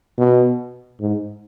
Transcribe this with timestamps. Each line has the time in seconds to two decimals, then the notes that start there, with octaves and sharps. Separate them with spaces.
0.18 B2
1.00 G#2